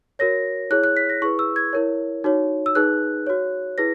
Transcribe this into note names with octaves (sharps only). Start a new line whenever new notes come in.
F#4 A#4 C#5 A#6
E4 G#4 C#5 F#6
F#6
B6
A#6
E4 G#4 B4 C#6
E6
G#6
E4 A#4 C#5
D#4 F#4 C#5
E6
D#4 G#4 B4 F#6
F#4 C#5
E4 G#4 B4 A#6